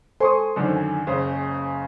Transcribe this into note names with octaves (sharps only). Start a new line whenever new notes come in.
A4 C5 G#5 C6 C#6 D#6
F#2 D3 D#3
G#5
F#1 C#3 C5